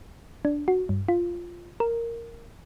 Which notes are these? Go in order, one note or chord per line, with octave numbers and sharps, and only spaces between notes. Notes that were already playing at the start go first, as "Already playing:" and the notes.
D4
F#4
G2
F4
A#4